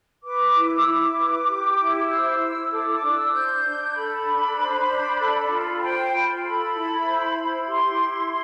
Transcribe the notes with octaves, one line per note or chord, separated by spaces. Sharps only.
B4 D6
E4
E6
E4 D6
B4
G4
E4
C5 E6
E4
A4 D6
D6
D4
E6
C5 G6
D4
A4 B5
D4
C5
D4
A4
F4
C5 G5
F4 B5
A4 B5
E4
C5
E4
G4 C6
E4
C6